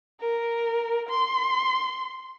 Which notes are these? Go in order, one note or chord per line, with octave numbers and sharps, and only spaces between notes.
A#4
C6